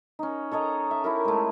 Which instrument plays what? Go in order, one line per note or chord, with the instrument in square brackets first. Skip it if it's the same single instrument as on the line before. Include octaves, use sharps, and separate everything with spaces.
[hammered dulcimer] C#4 D#4
A4 C#5 D#5 A#5
E5
E4 G4 A#4
G#3 A3